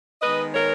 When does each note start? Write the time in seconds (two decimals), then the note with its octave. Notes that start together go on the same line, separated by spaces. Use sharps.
0.22 D#3 G#3 B3 B4 D#5
0.54 A#4 C#5